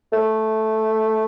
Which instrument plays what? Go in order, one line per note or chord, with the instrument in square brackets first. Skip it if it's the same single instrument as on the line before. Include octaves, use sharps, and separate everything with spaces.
[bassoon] A3